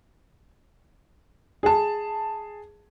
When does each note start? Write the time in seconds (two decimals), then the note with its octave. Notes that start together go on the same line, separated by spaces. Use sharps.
1.63 G#4 A5